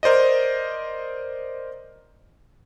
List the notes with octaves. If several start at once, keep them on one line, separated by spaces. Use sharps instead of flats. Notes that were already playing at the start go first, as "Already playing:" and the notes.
A#4 C5 D5 D#5